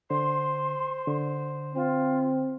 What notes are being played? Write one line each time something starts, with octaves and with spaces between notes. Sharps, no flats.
D3 C5 C6
D3
C4 F4